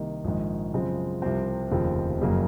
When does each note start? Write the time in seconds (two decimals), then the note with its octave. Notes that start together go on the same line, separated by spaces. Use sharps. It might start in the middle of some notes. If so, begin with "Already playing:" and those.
Already playing: C2 C3 D#3 A#3 D#4
0.24 A#1 G#2 D#3
0.74 F#2 C#3 F3 G#3 C4
1.22 C2 C3 F3 C4
1.71 F1 D#2 C#3 F3 C4
2.20 F#1 F2 C#3 F#3 A#3